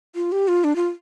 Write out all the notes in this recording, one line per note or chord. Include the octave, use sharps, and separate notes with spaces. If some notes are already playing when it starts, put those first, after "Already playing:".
F4
G4
F4
D4
F4